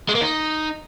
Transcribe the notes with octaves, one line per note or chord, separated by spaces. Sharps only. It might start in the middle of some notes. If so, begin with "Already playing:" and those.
G#3
A#3
D#4